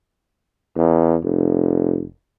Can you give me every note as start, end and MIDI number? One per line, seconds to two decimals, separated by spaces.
0.76 1.16 40
1.23 2.03 29